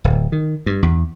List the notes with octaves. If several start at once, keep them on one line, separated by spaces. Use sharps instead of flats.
D1
D#3
G2
E2